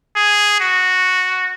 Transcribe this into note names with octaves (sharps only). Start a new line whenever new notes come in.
G#4
F#4